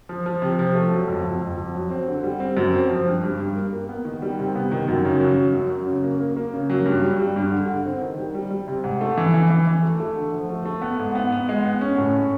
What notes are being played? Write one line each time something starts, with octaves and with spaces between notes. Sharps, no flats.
F3
F3
C3
F3
A3
F#3
F2
F2
F2
F2
F#3
C4
D3
G3
C4
F#2
C4
F3
G2
G2
G2
A#3
A#3
B3
D#3
G3
C3
B3
D#3
F#2
C#3
F#3
F#3
F#2
F#3
C#3
A#3
A#3
A#3
C#3
F#3
G2
G3
G3
G2
D3
D3
C4
D#3
G3
G3
G3
C3
G#2
A3
E3
E3
E3
E3
A3
A3
D3
F3
A3
A3
B3
G#2
B3
B3
G#3
B3
C#4
A2
C#4